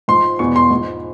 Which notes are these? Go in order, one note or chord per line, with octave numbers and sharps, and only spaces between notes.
G#2 F3 C6
E2 B2 C#6
C6
G#2 F3